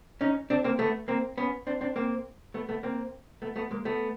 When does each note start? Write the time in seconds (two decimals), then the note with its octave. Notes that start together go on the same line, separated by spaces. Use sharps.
0.21 C#4 D#4
0.50 C4 D4
0.64 A#3 C4
0.79 A3 B3
1.08 A#3 C4
1.38 B3 C#4
1.67 C4 D4
1.81 C4 D4
1.96 A#3 C4
2.54 A3 B3
2.69 A3 B3
2.83 A#3 C4
3.42 A3 B3
3.56 A3 B3
3.71 G#3 A#3
3.85 A3 B3